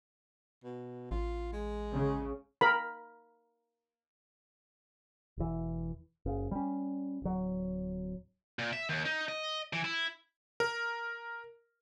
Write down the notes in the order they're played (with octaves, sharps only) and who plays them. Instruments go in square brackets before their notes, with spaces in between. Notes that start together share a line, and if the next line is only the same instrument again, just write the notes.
[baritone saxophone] B2
[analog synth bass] A1 [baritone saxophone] F4
[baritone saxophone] G#3
[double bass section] C#3
[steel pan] A#4 B5
[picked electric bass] E1 E3
F#1 C#3
G3 C#4
D1 F#3
[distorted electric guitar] A#2
E5
D#2
D#4
D#5
E3
E4
[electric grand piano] A#4